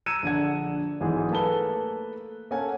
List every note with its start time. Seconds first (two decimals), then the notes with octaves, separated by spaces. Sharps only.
0.06 A#5 E6 G#6 C#7 D#7 E7
0.22 A#1 D3 F#5 G#6
1.00 B1 G#2 E3 G#4
1.31 A3 A#3 A4 B4 G7
2.51 A#3 C#4 A4 F#5 G#5